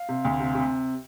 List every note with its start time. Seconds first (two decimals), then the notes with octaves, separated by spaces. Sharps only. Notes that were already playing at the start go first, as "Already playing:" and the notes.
Already playing: F5
0.09 C3
0.25 D2
0.40 C3
0.55 C3